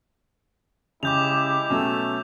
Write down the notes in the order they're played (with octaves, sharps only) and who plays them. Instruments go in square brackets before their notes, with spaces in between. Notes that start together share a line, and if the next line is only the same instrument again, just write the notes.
[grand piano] C#3 [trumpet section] G#3 E4 G4 [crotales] D6 G6 F7
[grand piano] B2 F#3 C#4 [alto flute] A3